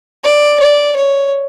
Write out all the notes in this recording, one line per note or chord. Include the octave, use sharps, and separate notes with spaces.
D5
D5
C#5